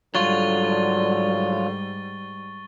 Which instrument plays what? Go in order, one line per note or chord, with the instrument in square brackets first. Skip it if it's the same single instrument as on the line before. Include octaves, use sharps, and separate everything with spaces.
[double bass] G#2 G3 [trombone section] D3 [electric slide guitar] F#3 F4 [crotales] C#6 A6 G7